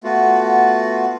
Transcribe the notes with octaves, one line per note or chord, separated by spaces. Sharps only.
A3 B3 F4 F#4